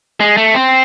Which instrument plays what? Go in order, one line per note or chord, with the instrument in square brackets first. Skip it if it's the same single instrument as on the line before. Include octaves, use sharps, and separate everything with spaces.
[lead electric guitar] G#3
A3
C4